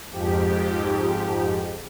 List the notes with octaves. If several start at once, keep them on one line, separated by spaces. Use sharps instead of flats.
F2 G#2 F3 G4